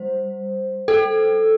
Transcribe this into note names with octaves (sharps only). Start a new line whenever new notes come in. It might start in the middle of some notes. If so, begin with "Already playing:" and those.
Already playing: G3 C5
A4